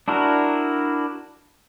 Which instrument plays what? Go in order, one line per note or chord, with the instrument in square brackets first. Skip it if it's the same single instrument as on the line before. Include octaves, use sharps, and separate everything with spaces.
[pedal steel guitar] D4 E4 F#4 A#4